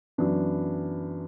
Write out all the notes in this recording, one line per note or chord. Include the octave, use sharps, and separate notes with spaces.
F#2 E3 B3 D4